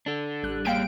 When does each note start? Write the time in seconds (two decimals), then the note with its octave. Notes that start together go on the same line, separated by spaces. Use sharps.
0.06 D4 A4
0.43 A1 G3 F#6
0.65 A#3 G4 G#4 F5 G5 D7